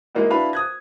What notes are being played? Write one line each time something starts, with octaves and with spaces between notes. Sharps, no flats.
G#3 A#3 D#4 E4 F#4
D4 E4 F#4 B4 F5 B5
D#6 F#6 G#6